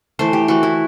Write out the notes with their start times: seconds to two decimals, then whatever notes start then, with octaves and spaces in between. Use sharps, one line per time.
0.19 E3 A3 C5
0.33 G4
0.48 E3 A3 F#4
0.63 E4